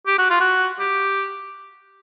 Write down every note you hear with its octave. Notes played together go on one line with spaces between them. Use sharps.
G4
F#4
F4
F#4
G4